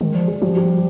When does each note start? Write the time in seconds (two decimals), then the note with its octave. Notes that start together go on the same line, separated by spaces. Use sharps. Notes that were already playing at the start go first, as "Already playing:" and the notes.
0.01 D#3 G#3
0.15 F3 D5
0.28 G#4
0.42 F3 G3
0.56 G3